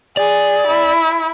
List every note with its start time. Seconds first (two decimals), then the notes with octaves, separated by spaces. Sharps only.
0.17 G#4 D5
0.67 E4